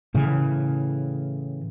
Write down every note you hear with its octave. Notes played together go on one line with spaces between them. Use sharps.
A2 C#3 E3